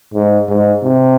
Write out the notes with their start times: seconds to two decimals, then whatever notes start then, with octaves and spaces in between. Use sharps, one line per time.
0.14 G#2
0.48 G#2
0.83 C3